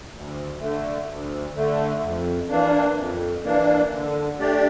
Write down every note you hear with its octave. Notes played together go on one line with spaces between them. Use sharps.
D2
D3 A3
D2
D3 A3
F2
E3 A#3 D4
F2
E3 A#3 D4
D3
A3 D4 G4 D5